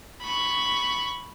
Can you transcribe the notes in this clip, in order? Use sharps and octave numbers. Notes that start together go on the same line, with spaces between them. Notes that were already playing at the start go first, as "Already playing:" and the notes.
B5 C#6